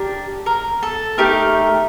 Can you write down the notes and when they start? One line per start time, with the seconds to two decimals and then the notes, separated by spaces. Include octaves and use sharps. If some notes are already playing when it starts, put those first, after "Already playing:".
Already playing: D4 G4 A#4
0.46 A#4
0.83 A4
1.18 A3 D#4 G4 A#4